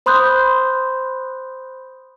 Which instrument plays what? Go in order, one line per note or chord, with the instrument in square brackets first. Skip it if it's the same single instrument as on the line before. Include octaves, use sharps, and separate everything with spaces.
[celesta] C5 B5 C6 D#6 F#6 G6